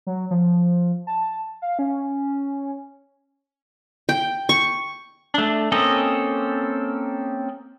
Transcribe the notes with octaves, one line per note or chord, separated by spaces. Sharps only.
F#3
F3
A5
F5
C#4
G5
C#6
A3 D4
A#3 C4 C#4 A4 D#5